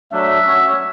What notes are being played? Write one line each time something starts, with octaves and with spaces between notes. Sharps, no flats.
F#3 A3 D4 E5
C#4 F#4 C#5